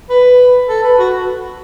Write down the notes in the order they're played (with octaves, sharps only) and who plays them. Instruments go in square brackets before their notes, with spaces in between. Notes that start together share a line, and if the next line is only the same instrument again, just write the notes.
[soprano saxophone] B4
A4
B4
F#4